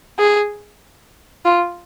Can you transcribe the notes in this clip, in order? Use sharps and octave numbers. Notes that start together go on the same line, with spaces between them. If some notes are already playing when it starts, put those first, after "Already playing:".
G#4
F4